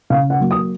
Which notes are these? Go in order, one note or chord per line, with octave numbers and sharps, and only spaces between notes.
C#3 F5
F#5
F#3 A#3
D#6